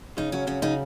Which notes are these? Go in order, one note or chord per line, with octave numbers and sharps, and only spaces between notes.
C#3 D#4
F#3 C#4
C#3 C#4
C#3 D#4